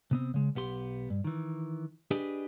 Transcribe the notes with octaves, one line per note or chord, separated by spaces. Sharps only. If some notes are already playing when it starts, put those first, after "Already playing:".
C3 B3 C4
C#3 G#3
B1 B3 G4 C6
G2
D#3 E3
D4 G4 G#4 B4 D#5